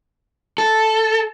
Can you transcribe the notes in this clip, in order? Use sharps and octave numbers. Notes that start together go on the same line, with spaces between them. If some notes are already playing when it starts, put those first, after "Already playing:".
A4